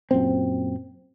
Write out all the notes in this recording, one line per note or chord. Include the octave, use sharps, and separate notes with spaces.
F#2 A#2 C4